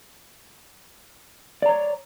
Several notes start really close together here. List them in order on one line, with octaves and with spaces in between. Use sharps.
D5 A#5 C#5